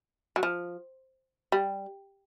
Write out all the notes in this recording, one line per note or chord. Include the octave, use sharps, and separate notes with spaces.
F#3
F3
G3